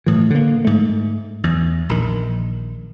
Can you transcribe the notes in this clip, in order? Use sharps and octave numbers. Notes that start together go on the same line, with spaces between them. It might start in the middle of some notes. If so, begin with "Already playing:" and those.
A2 E3
D3 A#3
G#2 A3
E2
A#1 D#3